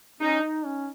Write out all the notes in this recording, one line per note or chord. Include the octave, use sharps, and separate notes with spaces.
C#4 D#4
D#4
C#4